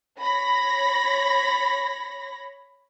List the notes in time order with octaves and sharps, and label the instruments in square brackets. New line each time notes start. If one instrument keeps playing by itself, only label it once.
[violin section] C#5 B5 A#6